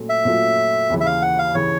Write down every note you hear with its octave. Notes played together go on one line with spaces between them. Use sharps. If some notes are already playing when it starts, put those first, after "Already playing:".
Already playing: A#2 F#3 A3 C#4
E5
A#2 F#3 A3 C#4 F4
D#2 C#3 E3
E5
F5
F#5
F5
C#3 E3 C#5